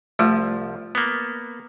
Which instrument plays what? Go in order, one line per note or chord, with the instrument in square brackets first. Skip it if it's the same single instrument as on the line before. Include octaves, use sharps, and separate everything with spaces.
[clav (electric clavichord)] C2 F3 [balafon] A3 F4
[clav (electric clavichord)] A#3 B3